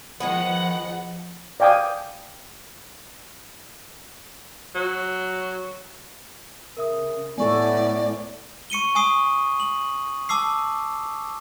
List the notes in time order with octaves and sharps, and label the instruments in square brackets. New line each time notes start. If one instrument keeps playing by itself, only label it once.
[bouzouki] D#3 G#3 B3 [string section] F3 F#5
[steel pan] D5 F5 G5 G#5 D6 D#6
[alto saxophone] F#3
[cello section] C#3 [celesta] A#4 E5 D#6
[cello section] A2 [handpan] B3 A4 [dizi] D5 [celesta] G#5 C#6
[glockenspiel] C#6 C#7 D#7 G7
G#5 C#6 D#6 C7
F#7
A5 D6 E6 C7